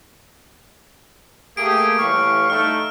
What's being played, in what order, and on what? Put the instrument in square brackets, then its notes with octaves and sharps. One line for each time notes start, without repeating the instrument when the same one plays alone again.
[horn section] A3 A#3 G4 [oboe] G#4 [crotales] D7
[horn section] A2 E3 G3 [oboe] F5 [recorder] C#6
[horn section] A3 D#4 A4 [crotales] F6